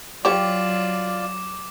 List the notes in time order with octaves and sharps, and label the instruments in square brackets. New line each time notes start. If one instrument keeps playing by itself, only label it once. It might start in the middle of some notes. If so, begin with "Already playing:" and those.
[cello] F#3 [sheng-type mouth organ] F4 D5 [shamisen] G4 C#5 [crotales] D6